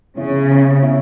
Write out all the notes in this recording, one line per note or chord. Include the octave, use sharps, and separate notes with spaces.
C#3 B3 E4 C#5 E5
B3 E4 C#5 E5